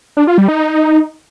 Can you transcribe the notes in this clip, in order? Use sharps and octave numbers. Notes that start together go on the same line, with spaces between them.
D4
F4
G3
D#4